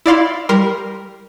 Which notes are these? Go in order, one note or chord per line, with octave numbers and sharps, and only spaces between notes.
E4 D5 F5 C6
G3 A#4 C6